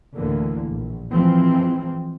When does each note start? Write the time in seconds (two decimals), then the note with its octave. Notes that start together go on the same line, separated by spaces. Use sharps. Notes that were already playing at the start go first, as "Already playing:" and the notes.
0.16 D2 A2 D3 E3 A#3
0.68 A#1
1.13 E3 F3 G#3 C4